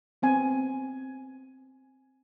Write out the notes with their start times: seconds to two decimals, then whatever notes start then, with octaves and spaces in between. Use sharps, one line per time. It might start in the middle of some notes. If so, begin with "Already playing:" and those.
0.22 B3 C4 G#5